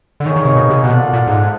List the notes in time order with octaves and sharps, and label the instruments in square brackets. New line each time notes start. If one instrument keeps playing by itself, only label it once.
[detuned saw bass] D3
[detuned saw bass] D#3 [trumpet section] A#3 D#4 G#4 C#5
[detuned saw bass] D#3
C3
B2
C3
[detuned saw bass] B2 [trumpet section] F4 A4 D5 F#5
[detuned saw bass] A#2
G#2